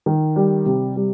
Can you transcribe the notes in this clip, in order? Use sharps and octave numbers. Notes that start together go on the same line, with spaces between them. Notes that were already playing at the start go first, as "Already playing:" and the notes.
D#3
G3
C3
G3